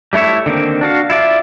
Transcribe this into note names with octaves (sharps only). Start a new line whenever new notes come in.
G3 A3 E4 C#5 E5
D3 D#3 A#3 C4
D4 F#4 F5
E4 F4 D5 E5